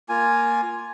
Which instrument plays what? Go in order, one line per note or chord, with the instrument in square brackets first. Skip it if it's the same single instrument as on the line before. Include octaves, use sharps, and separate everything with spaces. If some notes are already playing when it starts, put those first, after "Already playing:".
[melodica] A#3 F4 G#5